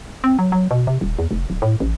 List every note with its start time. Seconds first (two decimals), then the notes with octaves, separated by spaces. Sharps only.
0.24 C4
0.39 F#3
0.52 F#3
0.71 B2
0.87 C3
1.01 D#1
1.19 E2
1.31 F1
1.50 D1
1.62 A2
1.80 A1